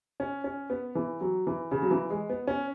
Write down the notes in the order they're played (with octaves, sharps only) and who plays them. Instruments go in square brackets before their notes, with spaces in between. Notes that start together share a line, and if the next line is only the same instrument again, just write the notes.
[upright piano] C#4
C#4
B3
E3
F#3
E3
C#3
F#3
E3
G#3
B3
C#4